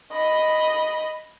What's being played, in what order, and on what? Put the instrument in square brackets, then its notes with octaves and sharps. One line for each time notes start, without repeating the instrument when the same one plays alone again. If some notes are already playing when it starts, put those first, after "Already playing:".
[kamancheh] D#5 B5